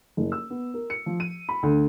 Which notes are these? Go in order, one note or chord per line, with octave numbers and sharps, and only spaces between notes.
F#1
E6
B3
A#4
C#7
F3
D#7
B5
D2